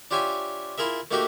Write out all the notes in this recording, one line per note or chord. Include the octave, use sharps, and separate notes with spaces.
D4 F4 G4 C#5 E5 G#5
E4 F4 G#4 A#4 E5
A3 A#3 D#4 F#4 G4 E5